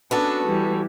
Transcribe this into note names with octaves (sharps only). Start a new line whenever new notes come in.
B3 C#4 D4 F#4 A4
E3 G3